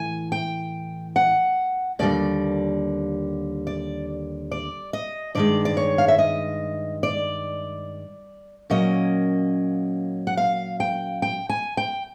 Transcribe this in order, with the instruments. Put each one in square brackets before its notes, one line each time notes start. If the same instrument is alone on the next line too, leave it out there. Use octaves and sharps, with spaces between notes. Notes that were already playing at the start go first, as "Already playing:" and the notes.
Already playing: [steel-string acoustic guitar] A2 E3 G#5
G5
F#5
D#2 D3 G3 A#3 D5
D5
D5
D#5
G2 D#3 G#3 D5
D5
C#5
F5
E5
D#5
D5
A#2 F#3 A#3 C#4 D#5
F#5
F5
G5
G5
G#5
G5